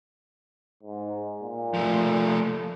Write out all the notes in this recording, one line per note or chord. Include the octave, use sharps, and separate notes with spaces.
G#2
A#2
F3 A3